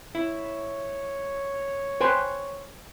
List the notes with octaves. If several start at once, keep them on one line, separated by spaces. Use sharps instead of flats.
E4 C#5
B4 C5 G5 G#5 C6